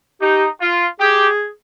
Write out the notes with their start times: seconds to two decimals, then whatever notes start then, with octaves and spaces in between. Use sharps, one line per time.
0.21 D#4 G4
0.61 F4
1.00 G4 G#4